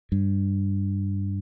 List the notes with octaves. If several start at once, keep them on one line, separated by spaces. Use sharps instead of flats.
G2